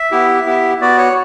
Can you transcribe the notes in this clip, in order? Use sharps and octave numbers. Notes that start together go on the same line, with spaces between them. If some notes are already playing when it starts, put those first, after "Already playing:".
Already playing: E5
B3 E4 G4
B3 E4 G4
B3 F#4 D5
C#5